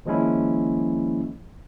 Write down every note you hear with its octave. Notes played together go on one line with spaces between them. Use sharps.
D#3 F3 G#3 A#3 C#4 E4